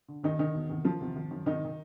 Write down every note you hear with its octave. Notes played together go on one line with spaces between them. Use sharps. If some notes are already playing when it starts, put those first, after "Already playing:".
D3
D#2 D#3 D#4
D3 D#3 D#4
E1
E2 C3 D#3
E1 F3 F4
E2 C3 D#3
G#1
F#2 D#3
G#1 D#3 D#4
D#3